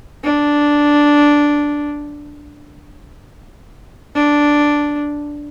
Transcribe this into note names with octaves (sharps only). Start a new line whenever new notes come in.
D4
D4